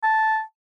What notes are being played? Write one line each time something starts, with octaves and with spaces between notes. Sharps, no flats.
A5